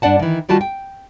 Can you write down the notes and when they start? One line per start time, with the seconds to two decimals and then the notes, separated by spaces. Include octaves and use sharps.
0.02 G2 D4 D5 F#5 A5
0.19 D#3 E3
0.49 D#3 G3 F4 F#4 A5
0.61 G5